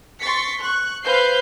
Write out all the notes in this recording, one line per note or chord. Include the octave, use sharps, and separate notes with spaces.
C6 C#6 A6 B6 C#7
C#6 F#6
B4 C5 F5 G6 C7